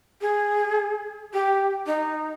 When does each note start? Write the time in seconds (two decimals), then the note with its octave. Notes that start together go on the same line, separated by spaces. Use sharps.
0.21 G#4
1.33 G4
1.86 D#4